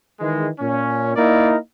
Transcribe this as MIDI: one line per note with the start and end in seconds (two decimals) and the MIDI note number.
0.20 0.48 51
0.20 0.48 52
0.20 0.48 56
0.59 1.14 46
0.59 1.14 61
1.16 1.55 58
1.16 1.55 63
1.16 1.55 64
1.16 1.55 70
1.16 1.55 74